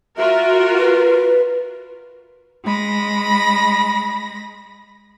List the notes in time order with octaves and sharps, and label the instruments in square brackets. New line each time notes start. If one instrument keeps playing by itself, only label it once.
[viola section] F4 F#4 A#4 [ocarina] E5
[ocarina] B4
[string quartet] G#3 B5 A#6